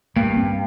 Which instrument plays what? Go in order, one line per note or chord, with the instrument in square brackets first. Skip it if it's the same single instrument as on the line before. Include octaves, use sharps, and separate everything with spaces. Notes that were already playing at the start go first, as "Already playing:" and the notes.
[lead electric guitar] G2 [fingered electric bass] A#3
[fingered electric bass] C4